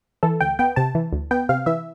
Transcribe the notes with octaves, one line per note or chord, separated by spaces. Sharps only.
E3 A4
D2 G5
B3 G5
C3 A5
E3
D2
B3 G5
C3 F5
E3 E5